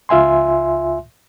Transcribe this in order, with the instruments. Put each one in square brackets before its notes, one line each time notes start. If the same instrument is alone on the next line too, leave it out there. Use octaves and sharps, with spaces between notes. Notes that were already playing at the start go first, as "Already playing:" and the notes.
[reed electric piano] C#2 F4 E5 G#5 C6